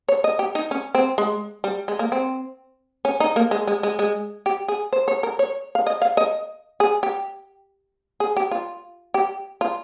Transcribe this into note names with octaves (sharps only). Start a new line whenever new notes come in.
C#5
D#5
G4
D#4
C#4
C4
G#3
G3
G#3
A#3
C4
C#4
D#4
A#3
G#3
G#3
G#3
G#3
G4
G#4
C5
C#5
A#4
C#5
F5
D#5
F5
D#5
G#4
G4
G#4
G4
F4
G4
F4